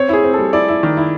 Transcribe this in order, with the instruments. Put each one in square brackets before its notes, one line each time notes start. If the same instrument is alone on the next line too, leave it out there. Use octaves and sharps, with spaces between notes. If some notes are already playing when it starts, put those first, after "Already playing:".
Already playing: [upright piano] C4 [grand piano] C#5
[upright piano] E4 [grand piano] G#4
[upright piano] C4
[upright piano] G3 [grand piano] A4
[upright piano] E4 [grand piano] D5
[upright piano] E4
D#3
E4